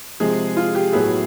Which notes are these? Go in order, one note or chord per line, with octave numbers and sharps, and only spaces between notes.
C3 F3 G#3 G#4
F4
G4
A2 F#3 B3 E4 G#4